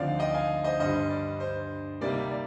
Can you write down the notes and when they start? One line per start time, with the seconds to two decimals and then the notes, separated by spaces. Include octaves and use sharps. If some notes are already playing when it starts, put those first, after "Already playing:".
Already playing: D2 D3 F3 C4 D#4 D5 F5
0.19 D#5 G5
0.34 F5 G#5
0.64 C5 D#5
0.80 G2 D3 G3 C5 D#5
1.10 D5
1.40 C5
2.01 C3 G3 A#3 D#4 D5
2.31 D5